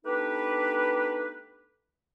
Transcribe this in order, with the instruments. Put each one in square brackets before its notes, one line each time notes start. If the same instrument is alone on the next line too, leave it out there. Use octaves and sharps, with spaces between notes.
[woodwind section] A3 B3 D4 D#4 G4 B4